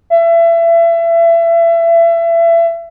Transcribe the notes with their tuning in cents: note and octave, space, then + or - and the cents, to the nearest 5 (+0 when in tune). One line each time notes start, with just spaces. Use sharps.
E5 +30